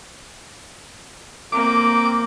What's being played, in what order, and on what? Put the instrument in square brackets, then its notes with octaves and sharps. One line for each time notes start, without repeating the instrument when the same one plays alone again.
[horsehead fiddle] A#3 C4 [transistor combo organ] D6